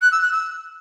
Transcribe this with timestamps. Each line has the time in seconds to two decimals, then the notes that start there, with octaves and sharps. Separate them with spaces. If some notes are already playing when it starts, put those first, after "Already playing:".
0.01 F#6
0.11 E6
0.21 F#6
0.31 E6